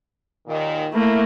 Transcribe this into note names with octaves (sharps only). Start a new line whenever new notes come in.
D#2 A#2 D#3
A3 A#3 E4 A#4